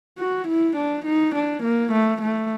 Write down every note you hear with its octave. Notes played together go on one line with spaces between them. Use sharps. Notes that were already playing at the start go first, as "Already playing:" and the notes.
F#4
E4
D4
D#4
D4
A#3
A3
A3